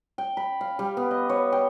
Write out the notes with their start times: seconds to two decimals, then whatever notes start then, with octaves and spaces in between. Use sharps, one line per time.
0.18 G5
0.37 B5
0.61 F5
0.79 G3
0.97 B3
1.11 D#5
1.29 C#5
1.52 G5